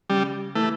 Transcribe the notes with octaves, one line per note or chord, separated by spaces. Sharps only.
C#3 G3
E3 A3